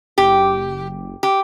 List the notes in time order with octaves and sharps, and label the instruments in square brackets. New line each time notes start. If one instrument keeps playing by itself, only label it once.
[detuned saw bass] F#1 [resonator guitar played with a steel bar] G4
[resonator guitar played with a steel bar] G4